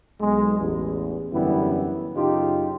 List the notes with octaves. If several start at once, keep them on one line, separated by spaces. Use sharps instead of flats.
B1 G#3
A1 E2
F#2 D3 E3 G3 B3 E4
F#2 C#3 D#4 F4 G4